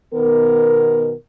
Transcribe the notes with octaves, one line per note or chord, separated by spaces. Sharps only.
B2 D#3 B3 A#4